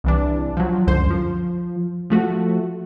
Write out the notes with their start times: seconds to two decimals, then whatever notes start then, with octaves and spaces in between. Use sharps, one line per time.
0.04 C2 E3 D4
0.57 F3 F#3
0.87 C#2 F#2 D3 C5
1.10 F3
2.10 F3 A3 F#4